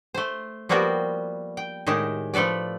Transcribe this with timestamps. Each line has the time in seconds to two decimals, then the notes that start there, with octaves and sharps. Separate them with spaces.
0.14 A3 C5
0.69 F3 G3 A#3 B3 F#4 G4
1.57 G5
1.87 A2 D#3 G#3 G4 A5
2.34 F3 A3 A4 B4 D5